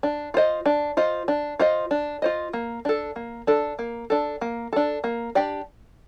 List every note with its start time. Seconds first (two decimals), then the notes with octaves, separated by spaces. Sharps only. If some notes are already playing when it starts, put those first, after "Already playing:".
0.03 D4
0.34 F4 C5 D#5
0.66 D4
0.97 F4 C5 D#5
1.28 D4
1.60 F4 C5 D#5
1.91 D4
2.22 F4 C5 D#5
2.53 A#3
2.85 D4 A4
3.16 A#3
3.47 D4 A4
3.79 A#3
4.10 D4 A4
4.41 A#3
4.73 D4 A4
5.04 A#3
5.35 D4 G4 D5